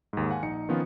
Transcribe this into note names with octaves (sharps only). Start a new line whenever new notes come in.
D#2 G#2
F5 F#5 G#5
A#1 D#4 C#7
D#3 F3 B3 C#4 F4